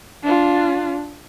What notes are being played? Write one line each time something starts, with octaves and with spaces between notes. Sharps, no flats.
D4 F4